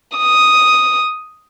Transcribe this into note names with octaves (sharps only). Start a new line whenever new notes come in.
D#6